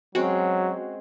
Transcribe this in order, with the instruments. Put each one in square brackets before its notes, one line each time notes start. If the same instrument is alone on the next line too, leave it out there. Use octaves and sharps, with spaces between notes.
[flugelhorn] F#3 [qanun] G#3 C4 C#4 [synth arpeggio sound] F#4